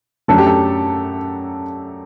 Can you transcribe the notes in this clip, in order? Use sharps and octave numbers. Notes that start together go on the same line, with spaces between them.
F#2 F#3 A3 D4 A4
G4
A4